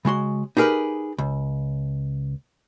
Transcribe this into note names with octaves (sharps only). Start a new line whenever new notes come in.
C#3 G#3 F#4 C6
D#4 G4 G#4 A#4 B4
C#2